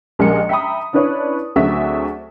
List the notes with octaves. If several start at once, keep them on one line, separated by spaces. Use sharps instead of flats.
A#1 G#3 G4 A#4 D#5 C#7
E5 G5 A#5 B5 D#6
C#4 D4 E4 B4 C#5 D5
D2 F#3 C4 F#4 G#4 E5